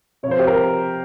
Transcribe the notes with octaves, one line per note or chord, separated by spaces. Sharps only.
C3 F3 C5 C#5
G4
A#4